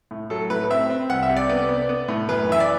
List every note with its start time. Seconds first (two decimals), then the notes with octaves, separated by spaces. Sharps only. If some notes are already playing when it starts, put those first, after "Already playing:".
0.11 A2
0.30 F#3 A4
0.50 A2 B4
0.70 C4 E5
0.90 C4
1.09 C2 F#5
1.23 E5
1.29 C3
1.37 D5
1.49 B3 D5
1.69 B3
1.89 B3
2.09 A2
2.29 F#2 B4
2.49 E3 E5
2.60 D5